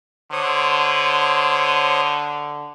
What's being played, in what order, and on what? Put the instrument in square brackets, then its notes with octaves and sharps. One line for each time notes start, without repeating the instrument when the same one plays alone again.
[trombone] D3 [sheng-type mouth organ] C5 C#5 D#6